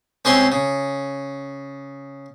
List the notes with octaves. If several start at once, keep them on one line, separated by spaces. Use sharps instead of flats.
C2 G#3 C4 C#4 C6
C#3